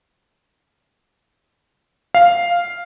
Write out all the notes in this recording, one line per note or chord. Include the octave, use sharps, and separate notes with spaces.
F5